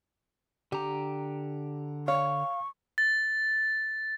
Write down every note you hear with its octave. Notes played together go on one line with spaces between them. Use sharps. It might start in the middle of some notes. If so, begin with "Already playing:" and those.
D3 G4 A#5
C#5 F5 C#6
A6